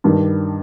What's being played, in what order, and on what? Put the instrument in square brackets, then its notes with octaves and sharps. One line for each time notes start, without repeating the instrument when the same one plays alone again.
[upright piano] G2 D#3 G3 D4